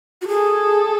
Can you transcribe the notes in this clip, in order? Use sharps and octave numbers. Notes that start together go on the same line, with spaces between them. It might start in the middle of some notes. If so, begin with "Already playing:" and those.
F#4
G#4 A4